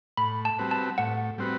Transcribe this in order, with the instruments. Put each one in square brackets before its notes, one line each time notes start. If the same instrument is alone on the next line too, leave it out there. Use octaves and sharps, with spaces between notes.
[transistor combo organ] A2 [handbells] B5
[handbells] A5
[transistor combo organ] G3 C4 F#4 B4
[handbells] A5
[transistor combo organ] A2 [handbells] F#5
[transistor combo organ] G3 C4 F#4 B4